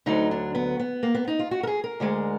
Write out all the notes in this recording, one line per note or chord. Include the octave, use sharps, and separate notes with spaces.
D2 D3 F#3 D#4
D4
B3
B3
A#3
B3
D#4
F4
F#4
A#4
G#4
A#4
D2 D3 G#3